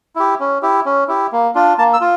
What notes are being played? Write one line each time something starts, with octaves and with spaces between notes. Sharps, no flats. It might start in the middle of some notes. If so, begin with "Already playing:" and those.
E4 G4
C#4
E4 G4
C#4
E4 G4
A#3
D4 F4
A#3 A5
E6
F4